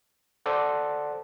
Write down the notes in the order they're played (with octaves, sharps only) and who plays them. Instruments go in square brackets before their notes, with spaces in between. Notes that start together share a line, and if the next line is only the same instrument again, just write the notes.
[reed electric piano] A4 C5 D5 F#5